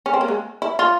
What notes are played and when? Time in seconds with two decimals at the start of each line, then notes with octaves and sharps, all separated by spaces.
0.06 C#4
0.14 C4
0.21 A#3
0.28 G#3
0.62 E4
0.79 F4